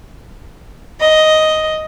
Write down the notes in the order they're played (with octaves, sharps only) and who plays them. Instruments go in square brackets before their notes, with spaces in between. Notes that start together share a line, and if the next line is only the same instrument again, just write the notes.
[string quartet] D#5